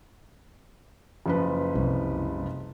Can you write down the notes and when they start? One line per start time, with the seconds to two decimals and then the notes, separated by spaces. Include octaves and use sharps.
1.26 F#1 F3 B4
1.75 C2